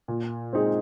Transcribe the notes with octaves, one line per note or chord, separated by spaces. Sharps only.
A#2
G#3 C4 D#4 G#4